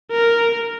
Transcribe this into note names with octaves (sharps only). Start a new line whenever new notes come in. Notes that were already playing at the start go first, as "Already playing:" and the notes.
A#4